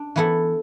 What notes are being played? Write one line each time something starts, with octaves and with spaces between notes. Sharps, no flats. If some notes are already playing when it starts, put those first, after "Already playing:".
Already playing: D4
E3 B3 E4 A4